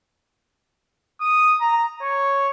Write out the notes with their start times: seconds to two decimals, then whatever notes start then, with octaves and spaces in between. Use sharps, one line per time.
1.21 D#6
1.61 A#5
2.02 C#5